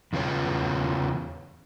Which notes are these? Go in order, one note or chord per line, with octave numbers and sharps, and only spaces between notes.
E2 C#3 F4 B4 C#5